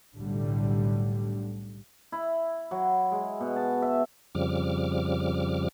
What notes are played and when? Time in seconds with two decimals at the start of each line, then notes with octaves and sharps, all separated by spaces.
0.16 B1 A2 D3 G3
2.12 E4
2.71 F#3
3.12 G#3
3.40 B2
3.56 A5
3.82 E5
4.35 F2 C#3 F3 G3 D6 F6